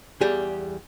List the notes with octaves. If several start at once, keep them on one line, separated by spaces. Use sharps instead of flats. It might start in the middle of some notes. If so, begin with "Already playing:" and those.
E2 G3 G4 G#4